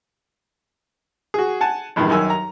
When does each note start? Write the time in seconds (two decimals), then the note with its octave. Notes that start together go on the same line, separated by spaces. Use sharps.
1.34 F#4 G#4
1.61 F#5 G#5 A5
1.96 A#1 E2 G2 D#3
2.10 F#2 D#3 G#5 E6
2.30 A#5